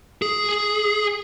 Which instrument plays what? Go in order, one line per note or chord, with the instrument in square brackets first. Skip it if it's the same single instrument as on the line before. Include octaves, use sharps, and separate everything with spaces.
[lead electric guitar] G#4